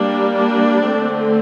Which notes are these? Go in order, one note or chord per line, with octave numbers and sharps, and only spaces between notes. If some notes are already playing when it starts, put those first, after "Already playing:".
Already playing: G3 A#3 D4
D4
D3 A3 C4